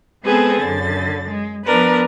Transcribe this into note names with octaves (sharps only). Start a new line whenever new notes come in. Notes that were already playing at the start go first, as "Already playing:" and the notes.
G#3 B3 C4 G#4 A4 B4
F#2 D3 A6
G#3
F3 B3 D4 A#4 B4